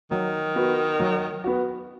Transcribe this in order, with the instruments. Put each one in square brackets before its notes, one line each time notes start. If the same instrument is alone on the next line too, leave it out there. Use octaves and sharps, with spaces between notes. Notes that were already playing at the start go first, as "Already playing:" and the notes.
[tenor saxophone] D#3 [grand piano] F#3
[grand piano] B3 F#4
F#3
B3 F#4